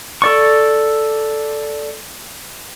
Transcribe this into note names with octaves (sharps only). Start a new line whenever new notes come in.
A4 D5 C#6